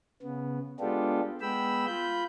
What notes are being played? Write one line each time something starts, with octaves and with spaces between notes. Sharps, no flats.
C#3 B3
G#3 B3 D4 F4 G4 A4
G#3 B3 G5 B5 E6
F4 B5 G6